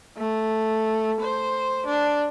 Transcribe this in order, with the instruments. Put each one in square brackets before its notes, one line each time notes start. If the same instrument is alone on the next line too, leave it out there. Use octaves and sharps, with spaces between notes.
[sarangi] A3
C5
D4